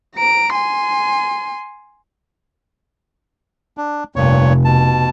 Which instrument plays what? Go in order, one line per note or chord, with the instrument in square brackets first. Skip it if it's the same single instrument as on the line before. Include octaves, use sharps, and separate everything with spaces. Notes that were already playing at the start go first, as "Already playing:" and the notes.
[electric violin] A#5 D7
G#5 C6
[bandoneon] D4
[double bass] F1 [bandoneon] G2 A#2 C#5
[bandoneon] B2 A5